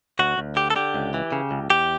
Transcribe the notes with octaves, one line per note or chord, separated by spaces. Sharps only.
D2 F#4
D2
D3 G4
A4
D3 G4
C#2
E3
C#3
C#2
E2 G4